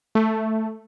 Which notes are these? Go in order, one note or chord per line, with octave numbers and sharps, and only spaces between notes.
A3